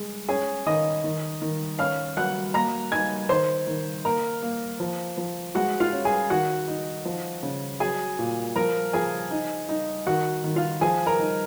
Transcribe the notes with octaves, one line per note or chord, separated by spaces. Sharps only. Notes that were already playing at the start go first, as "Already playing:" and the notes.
Already playing: G#3
C#4 G#4 G#5
D#3 D#5 D#6
D#3
D#3
C#4 F5 F6
F#3 F#5 F#6
A#3 A#5 A#6
D#4 G#5 G#6
D#3 C5 C6
D#3
A#3 A#4 A#5
A#3
F3
F3
G#3 F#4 F#5
F4 F5
C#4
G#4 G#5
D#3 F#4 F#5
D#4
F3
C#3
F#3 G#4 G#5
A#2
F3 A#4 A#5
F3 G#4 G#5
D#4
D#4
D#3 F#4 F#5
D#3
F4 F5
F3 G#4 G#5
A#4 A#5
D#4